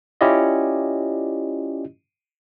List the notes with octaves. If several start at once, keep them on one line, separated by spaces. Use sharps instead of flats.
C#4 E4 F4 G4 D5 D#5